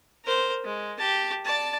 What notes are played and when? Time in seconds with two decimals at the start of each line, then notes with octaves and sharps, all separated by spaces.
0.25 A#4 C5
0.64 G#3
0.98 G4 A5
1.45 D5 A5